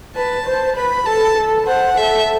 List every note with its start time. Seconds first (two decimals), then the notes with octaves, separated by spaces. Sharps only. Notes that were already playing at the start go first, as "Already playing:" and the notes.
0.16 B4 A5
0.47 C5
0.76 B4 B5
1.06 A4 A5
1.37 A4
1.67 C5 F#5
1.97 A4 E5